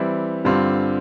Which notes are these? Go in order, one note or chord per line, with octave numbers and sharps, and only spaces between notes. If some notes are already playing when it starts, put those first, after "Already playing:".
Already playing: E3 G3 C4 E4
G2 D3 G3 C4 F4